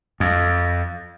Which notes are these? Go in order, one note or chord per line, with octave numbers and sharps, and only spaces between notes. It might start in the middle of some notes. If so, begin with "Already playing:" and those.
F2